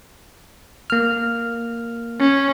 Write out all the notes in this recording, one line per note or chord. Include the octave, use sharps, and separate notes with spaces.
A#3 F6
C#4